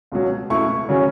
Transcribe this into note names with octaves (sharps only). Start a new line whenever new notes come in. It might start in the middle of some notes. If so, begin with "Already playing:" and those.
C#2 B2 F#3
C#2 B2 A3 E4 C#6
C#3 F#3 C#4